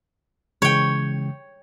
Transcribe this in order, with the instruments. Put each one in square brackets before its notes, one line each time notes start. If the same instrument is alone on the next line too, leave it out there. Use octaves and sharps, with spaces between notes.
[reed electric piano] C#3 E3 G#3 [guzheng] C#5 G5